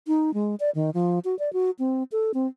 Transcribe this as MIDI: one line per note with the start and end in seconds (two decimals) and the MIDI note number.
0.07 0.34 63
0.34 0.55 56
0.60 0.70 74
0.75 0.90 51
0.94 1.19 53
1.25 1.38 66
1.39 1.52 74
1.53 1.71 66
1.79 2.03 60
2.12 2.32 69
2.34 2.47 60